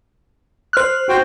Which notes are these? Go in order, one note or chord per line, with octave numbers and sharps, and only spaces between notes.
C5 F6 F#6
F#4 C5 G5